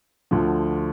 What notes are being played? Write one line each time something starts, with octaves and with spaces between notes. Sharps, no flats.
D2 D3 F3